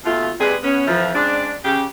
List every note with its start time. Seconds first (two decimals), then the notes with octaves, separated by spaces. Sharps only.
0.05 D#2 B2 A3 F4
0.40 D#2 C3 G3 G#3 G#4 B4
0.63 B3 C#4
0.86 F2 E3 F3
1.14 C#3 G#3 C4 D4
1.65 C#3 G4